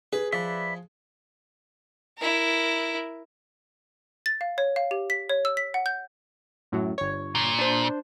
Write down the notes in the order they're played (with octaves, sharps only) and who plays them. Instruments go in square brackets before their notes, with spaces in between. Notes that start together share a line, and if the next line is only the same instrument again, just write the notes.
[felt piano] G#4 [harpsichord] B4
[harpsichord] F3 [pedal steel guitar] B4 D5 E5
[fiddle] E4 A#4
[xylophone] A6
F5
C#5
F5
G4
B6
C#5
E6
B6
F#5
G6
[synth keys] F#2 A2 F#3
G1 C#5
[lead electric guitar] A#2
[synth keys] D4 C5